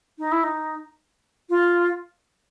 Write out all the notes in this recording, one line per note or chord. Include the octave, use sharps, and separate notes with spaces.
D#4
E4
D#4
F4